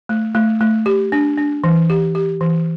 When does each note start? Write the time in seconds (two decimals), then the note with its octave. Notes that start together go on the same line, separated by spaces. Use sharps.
0.09 A3
0.35 A3
0.61 A3
0.86 G4
1.12 D4
1.38 D4
1.64 E3
1.90 G4
2.15 G4
2.41 E3